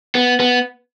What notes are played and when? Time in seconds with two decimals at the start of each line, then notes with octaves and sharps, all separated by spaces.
0.15 B3
0.40 B3